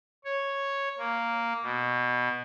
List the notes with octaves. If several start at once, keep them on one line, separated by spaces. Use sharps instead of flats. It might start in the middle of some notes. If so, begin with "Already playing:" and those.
C#5
A#3
B2